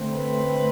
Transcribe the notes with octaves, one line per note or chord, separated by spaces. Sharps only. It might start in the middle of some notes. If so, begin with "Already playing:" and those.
Already playing: D3 A3 C4
B4